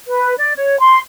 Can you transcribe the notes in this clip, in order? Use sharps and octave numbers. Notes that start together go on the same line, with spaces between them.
B4
D5
C#5
C6